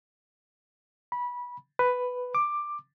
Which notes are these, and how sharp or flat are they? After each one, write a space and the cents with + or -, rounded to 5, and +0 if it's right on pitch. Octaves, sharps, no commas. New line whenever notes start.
B5 -20
B4 +5
D6 +10